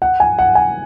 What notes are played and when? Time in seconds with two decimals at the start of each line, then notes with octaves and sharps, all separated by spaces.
0.02 F#5
0.20 G#5
0.39 F#5
0.55 G#5